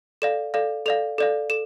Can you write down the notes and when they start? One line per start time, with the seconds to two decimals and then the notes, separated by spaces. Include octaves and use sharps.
0.22 A4 D5 F5 E7
0.54 A4 D5 F5
0.86 A4 D5 F5 F7
1.18 A4 D5 F5
1.50 A4 E7